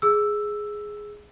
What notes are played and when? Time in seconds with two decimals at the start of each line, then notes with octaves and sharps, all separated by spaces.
0.02 G#4 E6